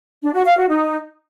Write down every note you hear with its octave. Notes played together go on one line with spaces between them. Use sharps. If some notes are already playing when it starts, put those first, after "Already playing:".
D4
F#4
F5
F#4
D#4